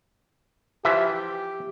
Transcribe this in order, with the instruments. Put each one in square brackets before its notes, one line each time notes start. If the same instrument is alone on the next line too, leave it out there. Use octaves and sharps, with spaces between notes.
[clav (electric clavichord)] E3 F3 E5 [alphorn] G4